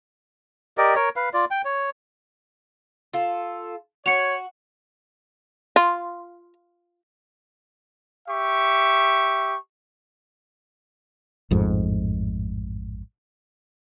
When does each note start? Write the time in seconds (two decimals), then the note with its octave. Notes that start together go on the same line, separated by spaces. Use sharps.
0.78 G4 A#4 D5 D#5
0.95 A#4 C#5
1.16 B4 F5
1.34 F4 D5
1.51 G5
1.65 C#5
3.13 F4 A4
4.06 F#4 C#5 C#7 F7
5.76 F4
8.29 G4 E5 C#6
11.51 A1 F2 G#2